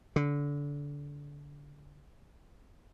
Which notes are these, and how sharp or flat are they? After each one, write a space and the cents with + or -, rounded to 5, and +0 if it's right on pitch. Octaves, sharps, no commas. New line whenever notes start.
D3 -25